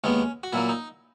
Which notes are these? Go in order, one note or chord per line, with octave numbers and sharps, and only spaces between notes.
D#2 D#3 G#3 B3 C#4
F#4
A#2 F#3 A#3 E4
D#4